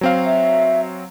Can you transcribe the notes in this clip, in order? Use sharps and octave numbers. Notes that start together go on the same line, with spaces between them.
F#3 C4 F5
E5